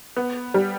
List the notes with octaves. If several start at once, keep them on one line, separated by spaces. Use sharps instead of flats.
B3
G3